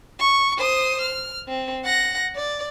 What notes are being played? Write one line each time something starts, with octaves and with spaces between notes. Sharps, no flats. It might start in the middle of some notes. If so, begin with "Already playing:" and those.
C#6
C5 D#6
F6
C4
F#5 A#6
D5